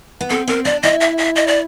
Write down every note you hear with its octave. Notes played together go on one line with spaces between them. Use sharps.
B3
C4 A4
C4 A#4
D4 D5
E4 D#5
E5
E5
D#5
D5